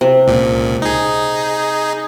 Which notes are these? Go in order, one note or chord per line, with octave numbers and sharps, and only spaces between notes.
C3
C#2 A#2
D#4 G#4